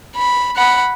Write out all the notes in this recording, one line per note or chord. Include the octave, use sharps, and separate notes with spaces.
B5
F#5 B5